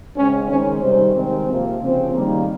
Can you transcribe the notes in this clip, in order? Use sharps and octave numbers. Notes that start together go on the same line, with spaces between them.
C#3 G#3 C4 C#4
D#3 G#3 C4 C#4
C3 D#3 G3 C4 C5
D#3 G#3 C4
C3 F3 A#3
C#3 F3 C4
D#3 G3 A#3